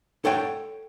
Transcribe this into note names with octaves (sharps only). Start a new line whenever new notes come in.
A4 C#5 F#5 G5